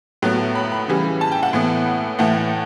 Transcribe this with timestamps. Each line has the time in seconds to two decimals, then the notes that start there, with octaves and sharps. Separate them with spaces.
0.22 A2 F#3 B3
0.55 B5
0.72 B5
0.88 C#3 E3 G3
1.21 A5
1.32 G5
1.43 F#5
1.53 A2 E3 B3
2.19 A2 E3 A3 F#5